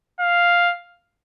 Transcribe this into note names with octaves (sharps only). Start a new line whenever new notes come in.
F5